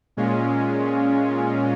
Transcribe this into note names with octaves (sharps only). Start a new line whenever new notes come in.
A#2 G#3 C#4 F4